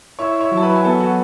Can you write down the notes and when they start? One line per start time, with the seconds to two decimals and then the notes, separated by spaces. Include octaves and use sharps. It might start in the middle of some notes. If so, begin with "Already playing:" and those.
0.19 E4 C#5 C#6
0.40 C#5 C#6
0.51 F#3
0.57 A5
0.62 B4 B5
0.76 G#5
0.84 B3 A4 A5
1.01 F#4 F#5